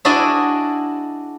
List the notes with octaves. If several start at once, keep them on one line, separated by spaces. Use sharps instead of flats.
D4 E4 F#4 G#4 D5 D#5